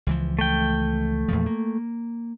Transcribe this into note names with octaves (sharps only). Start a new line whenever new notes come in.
C#2 E3 F3
A3 G5
E2 A#2 F3
A#3